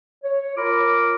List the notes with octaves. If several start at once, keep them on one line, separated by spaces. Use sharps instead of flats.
C#5
F4 A#4 B5 D6